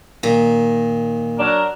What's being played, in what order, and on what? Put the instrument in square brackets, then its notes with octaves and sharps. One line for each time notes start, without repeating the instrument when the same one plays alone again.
[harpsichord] A#2 [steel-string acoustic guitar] D#3
[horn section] F#3 D4 A#4